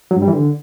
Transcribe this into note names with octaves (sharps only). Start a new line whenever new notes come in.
F#3
G2
G3
E3
D3